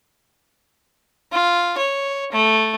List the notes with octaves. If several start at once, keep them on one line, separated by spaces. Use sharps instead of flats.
F4
C#5
A3